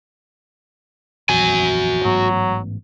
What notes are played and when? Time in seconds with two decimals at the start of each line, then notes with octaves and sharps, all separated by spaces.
1.29 A#1 E2 F#4 G#5
2.04 A1 G#2 F#3 B3